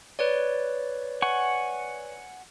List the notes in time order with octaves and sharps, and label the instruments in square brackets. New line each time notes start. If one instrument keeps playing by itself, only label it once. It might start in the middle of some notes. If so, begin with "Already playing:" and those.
[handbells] B4 C#5 D5
[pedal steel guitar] F#5 G#5 C#6